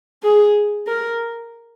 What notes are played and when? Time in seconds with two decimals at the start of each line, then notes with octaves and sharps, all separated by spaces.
0.23 G#4
0.87 A#4